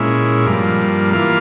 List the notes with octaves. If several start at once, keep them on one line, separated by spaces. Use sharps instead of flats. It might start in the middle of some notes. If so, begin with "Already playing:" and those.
Already playing: A#2 G#3 C#4 E4
G2 F3 A#3
E3 A#3 F4